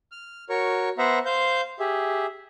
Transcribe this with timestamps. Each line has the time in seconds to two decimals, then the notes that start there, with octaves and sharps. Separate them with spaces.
0.12 F6
0.49 F#4 A#4 C#5 C#6
0.98 B3 C5 E5 F#5 A#5
1.25 C5 F5 G6
1.79 G4 G#4 E5